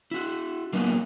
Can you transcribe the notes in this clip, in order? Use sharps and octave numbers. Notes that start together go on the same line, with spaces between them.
E4 F#4
F#3 A#3 B3 D#4